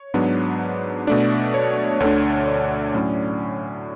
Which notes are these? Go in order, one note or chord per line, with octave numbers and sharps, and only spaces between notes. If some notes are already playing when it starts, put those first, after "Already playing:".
Already playing: C#5
G#2 F#3 B3 D4
B2 A3 D4 D5
C#5
D2 D3 A3 D4 C#5
D5
A2 F#3 C#4